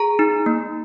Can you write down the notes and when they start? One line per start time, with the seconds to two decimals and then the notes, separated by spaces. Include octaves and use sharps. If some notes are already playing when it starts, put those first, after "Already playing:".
Already playing: G#4 A#5
0.19 D#4
0.46 A#3